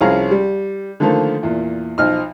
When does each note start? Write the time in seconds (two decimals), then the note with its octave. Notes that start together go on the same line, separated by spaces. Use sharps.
0.01 C2 F3 C#4 G#4 F5 A#5
0.31 G3
1.00 D3 D#3 F3 A3 A#3
1.43 E2 A#2
1.98 B1 F3 D#5 F6